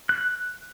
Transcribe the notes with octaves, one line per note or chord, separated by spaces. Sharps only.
F#6